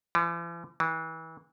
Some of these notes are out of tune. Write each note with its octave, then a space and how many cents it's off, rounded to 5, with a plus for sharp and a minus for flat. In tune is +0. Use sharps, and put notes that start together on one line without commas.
E3 +45
E3 -30